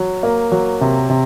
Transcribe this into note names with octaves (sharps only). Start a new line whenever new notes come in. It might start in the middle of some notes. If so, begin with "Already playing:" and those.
Already playing: F#3
A#3
F#3
C3
C3